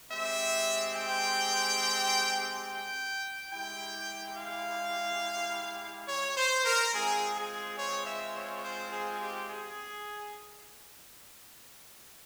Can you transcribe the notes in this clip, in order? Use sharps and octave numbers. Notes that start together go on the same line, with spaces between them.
G#3 C4 G4 E5
G5
G5
G#3 E4 G4 G5
F5
C#5
C5
A#4
G#3 C4 F4 G#4
G#4
C#5
E5
C#5
C5
G#4
G4
G#4